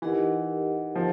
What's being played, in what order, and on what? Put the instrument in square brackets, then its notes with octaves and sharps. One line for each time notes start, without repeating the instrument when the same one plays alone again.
[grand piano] E3 [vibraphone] D#4 G4 A#4 D#5 F#5
[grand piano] F3